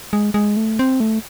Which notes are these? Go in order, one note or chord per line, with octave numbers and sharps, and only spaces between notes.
G#3
G#3
A3
C4
A3